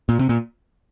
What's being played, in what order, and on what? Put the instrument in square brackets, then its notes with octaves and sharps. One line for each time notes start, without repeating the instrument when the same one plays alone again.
[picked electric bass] A#2
C3
A#2